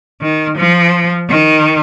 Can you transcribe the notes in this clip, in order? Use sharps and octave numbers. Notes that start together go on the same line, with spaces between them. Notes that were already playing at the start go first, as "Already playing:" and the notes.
D#3
F3
D#3